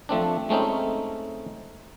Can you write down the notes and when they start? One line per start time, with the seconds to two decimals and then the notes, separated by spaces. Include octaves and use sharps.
0.09 F3 A3 C4 D4
0.49 G#3 A3 C4 C#4 D#4